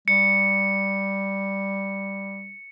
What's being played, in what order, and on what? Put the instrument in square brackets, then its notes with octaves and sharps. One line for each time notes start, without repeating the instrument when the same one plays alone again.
[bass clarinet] G3 [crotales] C#7